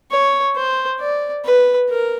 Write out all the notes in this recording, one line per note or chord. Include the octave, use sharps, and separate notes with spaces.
C#5
C5
D5
B4
A#4